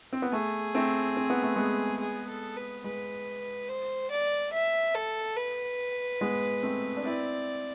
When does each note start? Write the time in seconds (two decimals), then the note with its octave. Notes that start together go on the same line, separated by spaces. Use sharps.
0.13 C4
0.22 B3
0.32 A3 G#4
0.75 A3 C4
1.17 C4
1.30 B3
1.42 A3
1.56 G#3 B3
2.00 G#4
2.28 A4
2.56 B4
2.84 G#3 B4
3.69 C5
4.11 D5
4.53 E5
4.95 A4
5.37 B4
6.21 G#3 B3
6.63 A3 C4
6.97 D4
7.04 C4 E4 D5